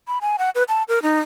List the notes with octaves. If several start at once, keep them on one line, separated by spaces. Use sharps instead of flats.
B5
G#5
F#5
B4
A5
A#4
D#4